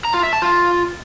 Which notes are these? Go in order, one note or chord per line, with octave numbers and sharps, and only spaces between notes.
A#5
F4
E5
A5
F4